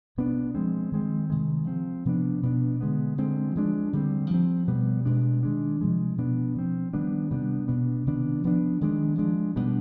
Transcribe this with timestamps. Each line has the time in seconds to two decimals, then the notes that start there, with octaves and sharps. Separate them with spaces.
0.18 B2 B3 D4
0.55 F3 G#3 C4
0.92 D#3 G#3 C4
1.30 C3 D#3 G#3
1.67 F3 C4
2.05 C3 F3 B3 D4
2.43 B2 B3 D4
2.81 D3 G#3 B3
3.18 D3 G#3 C4
3.56 F3 G#3 D4
3.93 D3 G3 C4
4.30 F3 C4
4.68 B2 G3 B3
5.05 B2 G#3 D4
5.43 D#3 G#3 D4
5.81 C3 F3 G#3
6.18 B2 B3 D4
6.56 F3 C4
6.93 D#3 G3 B3 D4
7.31 C3 G3 B3 D4
7.68 B2 B3 D4
8.06 C3 D#3 B3 D4
8.44 F3 B3 D4
8.81 D#3 G#3 D4
9.18 F3 G#3 D4
9.56 B2 G3 B3 D4